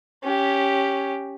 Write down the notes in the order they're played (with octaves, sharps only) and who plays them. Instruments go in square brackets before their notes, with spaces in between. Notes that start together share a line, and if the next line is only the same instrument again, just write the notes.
[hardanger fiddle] C#4 G4